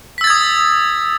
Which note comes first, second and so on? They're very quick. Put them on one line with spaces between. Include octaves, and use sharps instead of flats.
B6 E6 A6 G#6 D#6